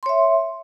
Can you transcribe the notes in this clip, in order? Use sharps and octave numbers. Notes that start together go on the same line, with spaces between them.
C#5 E5 C6